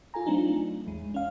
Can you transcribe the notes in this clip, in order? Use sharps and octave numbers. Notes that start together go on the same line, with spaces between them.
F4 A4 G#5 A#5
F#3 A3 C4 D4 D#4 F4
A1 E2 G#3
C#4 F5